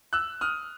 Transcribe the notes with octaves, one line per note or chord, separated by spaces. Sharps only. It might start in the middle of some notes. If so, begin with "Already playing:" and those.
E6 F#6
D#6 F6